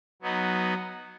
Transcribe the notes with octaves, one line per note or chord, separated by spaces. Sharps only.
F#3 B3 D#4